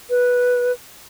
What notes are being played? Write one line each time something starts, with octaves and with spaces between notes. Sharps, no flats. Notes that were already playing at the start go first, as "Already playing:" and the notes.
B4